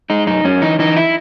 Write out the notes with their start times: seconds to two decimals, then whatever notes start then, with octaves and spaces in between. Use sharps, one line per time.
0.10 G#3 D#4
0.27 F#2 D#4
0.44 F#2 C#4
0.61 E3 D#4
0.79 E3 D#4
0.97 E4